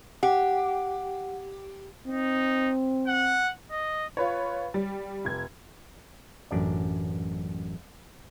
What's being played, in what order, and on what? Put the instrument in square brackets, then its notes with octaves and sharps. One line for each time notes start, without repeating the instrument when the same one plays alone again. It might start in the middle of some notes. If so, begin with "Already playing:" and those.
[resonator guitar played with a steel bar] G4 [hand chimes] F#5
[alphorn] C4 [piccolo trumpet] D#4
[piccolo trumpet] F#5
D#5
[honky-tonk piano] F4 B4 C#5
G3
F1 G#6
[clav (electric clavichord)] A1 F#2 D4 D5